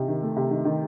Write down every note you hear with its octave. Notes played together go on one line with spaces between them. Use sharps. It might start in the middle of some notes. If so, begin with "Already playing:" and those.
Already playing: C3 D#4
D#3
A3
C3
D#3
D#3